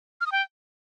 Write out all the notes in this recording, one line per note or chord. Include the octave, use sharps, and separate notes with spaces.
F6
D#6
G5